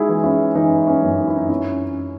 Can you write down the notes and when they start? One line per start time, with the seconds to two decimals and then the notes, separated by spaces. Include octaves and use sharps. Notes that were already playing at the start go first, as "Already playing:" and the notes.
Already playing: G#3 D#4 E4 F#4 G#4
0.09 E3
0.23 C#4 E4
0.55 E3 D#4
0.87 C#4
1.02 F#2
1.18 D#4
1.28 E4
1.37 D#4
1.49 C#4 E4